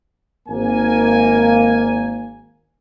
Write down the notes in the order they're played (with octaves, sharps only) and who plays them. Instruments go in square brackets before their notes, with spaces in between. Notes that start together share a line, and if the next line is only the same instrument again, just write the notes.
[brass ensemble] G#1 A#3 G#5